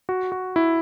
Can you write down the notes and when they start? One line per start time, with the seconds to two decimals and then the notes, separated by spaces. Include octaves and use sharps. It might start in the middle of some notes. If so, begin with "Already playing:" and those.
0.09 F#4
0.32 F#4
0.56 E4